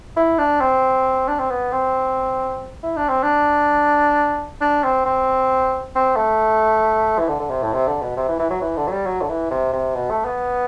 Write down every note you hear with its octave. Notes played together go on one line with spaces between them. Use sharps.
E4
D4
C4
D4
C4
B3
C4
E4
D4
C4
D4
D4
C4
C4
C4
A3
E3
D3
D3
C3
A2
C3
D3
B2
C3
E3
E3
F#3
E3
D3
F#3
G3
F#3
D3
E3
C3
C3
B2
A3
B3